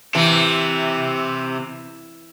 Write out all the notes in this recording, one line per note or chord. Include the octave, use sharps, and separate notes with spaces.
C3 E3